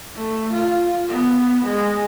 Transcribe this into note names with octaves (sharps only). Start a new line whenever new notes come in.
A3
F4
B3
G#3